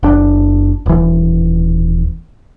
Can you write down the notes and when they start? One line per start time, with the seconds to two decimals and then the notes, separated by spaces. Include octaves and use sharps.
0.03 F#1 D4
0.86 D#1 E3